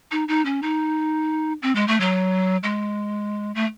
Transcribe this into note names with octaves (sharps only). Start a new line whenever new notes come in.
D#4
D#4
C#4
D#4
C4
G#3
A3
F#3
G#3
A3